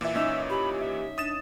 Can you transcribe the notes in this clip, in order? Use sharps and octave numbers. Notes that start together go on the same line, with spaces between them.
A#2 E3 E5 E6
C#4 D#4 E5 E6
G4 B5
E5
D4 D#6 A6 E7